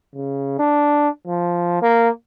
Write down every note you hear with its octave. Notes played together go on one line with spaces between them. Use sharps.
C#3
D4
F3
A#3